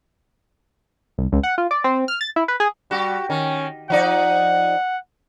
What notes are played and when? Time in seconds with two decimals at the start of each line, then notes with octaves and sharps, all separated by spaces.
1.18 C2
1.32 C#2
1.43 F#5
1.58 F4
1.71 D5
1.84 C4
2.08 F6
2.21 A6
2.36 E4
2.48 B4
2.60 G#4
2.91 G3 F#4 G4
3.30 D#3 C#4
3.90 F3 D#4 D5 F#5